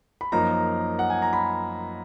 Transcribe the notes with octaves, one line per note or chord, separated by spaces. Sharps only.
B5
F#2 F3 A#3 D#4 A#5
F#5
G#5
A#5
B5